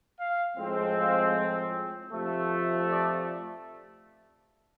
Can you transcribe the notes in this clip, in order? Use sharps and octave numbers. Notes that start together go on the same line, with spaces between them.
F5
A2 F3 G#3 C4
F5
F2 C3 F3 A3
D5